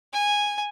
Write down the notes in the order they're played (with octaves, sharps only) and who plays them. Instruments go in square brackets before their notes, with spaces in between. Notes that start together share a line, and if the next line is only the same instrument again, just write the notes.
[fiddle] G#5